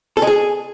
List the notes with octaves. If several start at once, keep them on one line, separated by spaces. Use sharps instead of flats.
A4
G#3
G#4